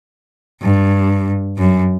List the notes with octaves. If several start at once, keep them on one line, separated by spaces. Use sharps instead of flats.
G2
F#2